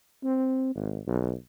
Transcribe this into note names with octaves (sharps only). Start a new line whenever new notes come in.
C4
G#1
B1